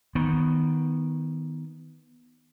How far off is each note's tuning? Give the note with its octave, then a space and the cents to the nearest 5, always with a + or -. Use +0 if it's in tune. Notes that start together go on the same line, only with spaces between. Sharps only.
D#3 +15 B3 +0